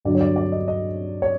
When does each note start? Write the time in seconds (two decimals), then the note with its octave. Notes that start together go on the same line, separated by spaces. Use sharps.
0.05 G2 D3 F#3 D5
0.15 C#5
0.21 D5
0.36 D5
0.52 D#5
0.68 D#5
1.22 C#5